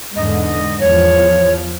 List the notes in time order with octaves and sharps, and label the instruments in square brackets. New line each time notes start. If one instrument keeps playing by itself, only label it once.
[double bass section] E2 G#2 D3 [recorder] D#5
[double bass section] E2 F3 [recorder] C#5